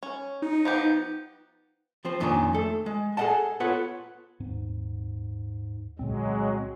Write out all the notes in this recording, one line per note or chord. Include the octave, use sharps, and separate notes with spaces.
C#4
D#4
F3 B3 G4
F3 C4 C5
F2 A#2 D#3 C#4 D4 A#5
A3 A4
G#3
G#4 A4 B4 D#5 F#5 A5
B3 F4 A4 B4 C#5 F#5
D#1 G#2 C4
C2 A#2 D3 F#3 G#3 C4